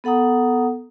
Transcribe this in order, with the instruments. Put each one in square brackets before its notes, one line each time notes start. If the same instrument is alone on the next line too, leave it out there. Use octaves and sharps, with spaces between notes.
[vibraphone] B3 A4 F#5 A#5 D#6